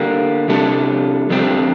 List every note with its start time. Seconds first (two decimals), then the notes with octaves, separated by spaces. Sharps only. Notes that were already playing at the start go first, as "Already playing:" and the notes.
Already playing: D3 G3 A#3
0.49 C3 G3 D4 A4
1.29 F2 D3 G3 C4